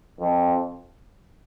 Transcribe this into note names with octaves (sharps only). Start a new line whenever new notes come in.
F2